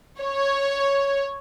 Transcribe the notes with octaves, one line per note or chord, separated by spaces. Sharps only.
C#5